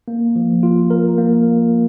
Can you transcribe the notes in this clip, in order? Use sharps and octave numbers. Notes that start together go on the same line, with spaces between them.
A#3
F3
F4
A#4
A#3